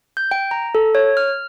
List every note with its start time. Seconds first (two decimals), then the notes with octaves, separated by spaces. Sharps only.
0.17 G6
0.31 G5
0.51 A#5
0.75 A4
0.95 C#5
1.17 F6